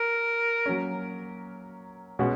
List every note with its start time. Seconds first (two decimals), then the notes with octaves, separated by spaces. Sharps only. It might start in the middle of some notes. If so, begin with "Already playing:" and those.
Already playing: A#4
0.66 F#3 A#3 C#4
2.19 B2 G#3 C#4 F#4